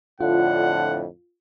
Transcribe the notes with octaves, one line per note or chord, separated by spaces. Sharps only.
F2 A2 D3 F4 F#5